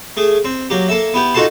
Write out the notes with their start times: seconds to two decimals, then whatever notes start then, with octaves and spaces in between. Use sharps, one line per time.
0.17 A3 G#4
0.45 C4
0.70 F#3 A#3 G4
0.88 A#3 A4 E5
1.14 B3 E4 G4
1.34 D#4 F4 F#4 A4 A5 C6